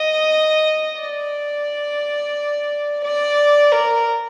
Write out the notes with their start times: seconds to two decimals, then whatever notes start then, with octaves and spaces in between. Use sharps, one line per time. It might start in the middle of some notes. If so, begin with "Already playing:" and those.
Already playing: D#5
1.00 D5
3.03 D5
3.72 A#4